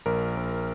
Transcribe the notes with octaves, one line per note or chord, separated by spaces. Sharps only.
A#1 A#4
A#1